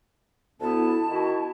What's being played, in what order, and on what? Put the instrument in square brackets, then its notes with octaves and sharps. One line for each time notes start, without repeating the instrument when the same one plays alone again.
[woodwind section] D2 B3 E4 [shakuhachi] A5
[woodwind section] D#3 E4 F#4